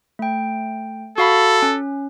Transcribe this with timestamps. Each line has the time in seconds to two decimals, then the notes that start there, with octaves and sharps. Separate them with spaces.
0.19 A3 G5
1.18 F#4 A4 F5 B5
1.62 C#4